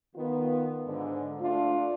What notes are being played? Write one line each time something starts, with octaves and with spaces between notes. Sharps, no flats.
D#3 B3 F4
G#2 D3
A3 D4 F4